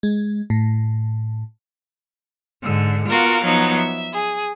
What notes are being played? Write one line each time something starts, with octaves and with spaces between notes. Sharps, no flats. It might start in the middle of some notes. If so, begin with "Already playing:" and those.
G#3
A2
G#2 D3
B3 F4 F#4 A#4 F5
F3 F#3 B3 D#4
E5
G#4